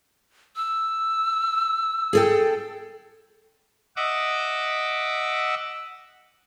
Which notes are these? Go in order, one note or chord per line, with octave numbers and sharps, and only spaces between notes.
E6
G#4 A4 G5
D#5 E5 F#5 D6 E6